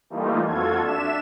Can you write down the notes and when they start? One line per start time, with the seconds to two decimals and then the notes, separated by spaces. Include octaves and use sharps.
0.10 E3 G3 A3 A#3 D#4 F4
0.46 F2 F4 F#4 A4 G#6
0.80 D4 E5 E7